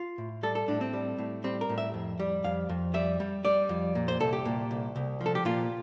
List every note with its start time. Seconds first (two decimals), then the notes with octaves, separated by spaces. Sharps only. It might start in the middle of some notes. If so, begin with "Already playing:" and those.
Already playing: F4
0.18 A2
0.43 G3 A4
0.55 A4
0.68 A2 D4
0.81 C4
0.93 G3
1.18 A2
1.44 G3 C4
1.61 A#4
1.70 A2
1.78 E5
1.94 F2
2.20 G3
2.44 F2 F5
2.69 F2
2.94 G3 E5
3.20 G3
3.45 G3 D5
3.69 F2
3.95 A#2
4.08 C5
4.20 C2 A4
4.33 G4
4.45 A#2
4.71 C2
4.96 C2
5.21 F3
5.26 A4
5.35 G4
5.45 A#2 F4